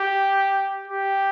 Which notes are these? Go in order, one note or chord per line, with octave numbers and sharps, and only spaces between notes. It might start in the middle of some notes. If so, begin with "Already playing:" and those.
Already playing: G4
G4